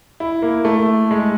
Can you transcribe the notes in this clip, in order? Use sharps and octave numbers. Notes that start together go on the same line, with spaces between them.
E4
A#3
A3
G#3